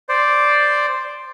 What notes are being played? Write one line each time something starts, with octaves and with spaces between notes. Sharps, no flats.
C5 D5